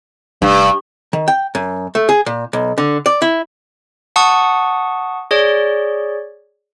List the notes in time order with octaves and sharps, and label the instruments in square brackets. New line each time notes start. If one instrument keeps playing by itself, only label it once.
[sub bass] F1 [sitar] G2
[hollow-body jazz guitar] D#3
G5
F#2
A3
G#4
A#2
B1
D3
D5
E4
[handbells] F#5 A5 C#6 D#6
G#4 C#5 D5